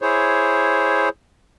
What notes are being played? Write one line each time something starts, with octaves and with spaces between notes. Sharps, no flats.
E4 G#4 C5 C#5